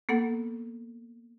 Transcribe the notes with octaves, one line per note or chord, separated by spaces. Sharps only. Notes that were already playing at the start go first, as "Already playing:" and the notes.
A#3 B3 A4 F#5